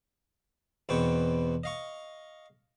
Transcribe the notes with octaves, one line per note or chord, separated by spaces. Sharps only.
E2 B2 C4 B4 G5 C#6
D#5 F5 C#6